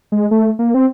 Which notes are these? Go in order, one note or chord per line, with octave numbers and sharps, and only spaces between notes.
G#3
A3
A#3
C4